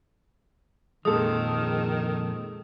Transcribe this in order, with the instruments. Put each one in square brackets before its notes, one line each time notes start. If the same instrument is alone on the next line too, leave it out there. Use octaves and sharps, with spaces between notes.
[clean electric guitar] F2 A#2 F3 [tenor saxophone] D#3 [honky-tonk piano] G#3 A4 [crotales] D#6